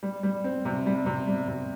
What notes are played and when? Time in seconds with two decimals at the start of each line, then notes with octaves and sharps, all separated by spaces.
0.03 G3
0.23 G3
0.44 C4
0.65 C3
0.86 G3
1.06 C3
1.27 G3
1.48 C3